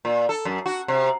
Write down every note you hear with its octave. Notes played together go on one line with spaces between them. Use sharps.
A#2
A4
F#2
F#4
C3